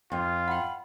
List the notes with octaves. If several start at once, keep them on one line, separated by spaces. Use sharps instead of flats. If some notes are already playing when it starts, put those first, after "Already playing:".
F2 F4
F#5 G5 B5